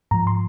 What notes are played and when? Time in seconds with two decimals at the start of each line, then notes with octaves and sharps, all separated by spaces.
0.11 G#2 F3 A#5
0.27 C6